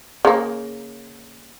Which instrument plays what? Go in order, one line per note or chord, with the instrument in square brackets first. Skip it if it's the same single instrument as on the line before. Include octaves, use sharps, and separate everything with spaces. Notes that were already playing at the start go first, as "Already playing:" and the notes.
[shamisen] C#3 A#3